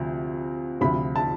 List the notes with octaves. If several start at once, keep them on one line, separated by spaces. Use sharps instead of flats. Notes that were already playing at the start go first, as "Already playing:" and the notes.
Already playing: D2 C3 F3
D2 C3 F3 B5
A5